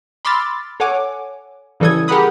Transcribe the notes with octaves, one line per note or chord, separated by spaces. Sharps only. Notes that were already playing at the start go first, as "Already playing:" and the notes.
B5 C6 D6 E6 F6 A6
A4 C#5 F#5 G#5 D6
C#3 E3 G3 A4 D#6 G#6
G4 G#4 A#4 F#5 B5 D#6